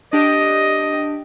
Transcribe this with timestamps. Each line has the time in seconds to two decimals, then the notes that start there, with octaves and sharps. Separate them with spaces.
0.13 D4 G4 D#5 D7